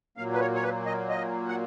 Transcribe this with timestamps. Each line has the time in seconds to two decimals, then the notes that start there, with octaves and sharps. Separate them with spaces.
0.17 A#2 F#3 A#3 F5
0.33 B4
0.40 C#5
0.55 C#5
0.63 B4
0.86 D#5
1.09 D#5
1.48 F#5